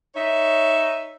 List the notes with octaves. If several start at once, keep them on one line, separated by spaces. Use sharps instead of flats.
D#4 C#5 E5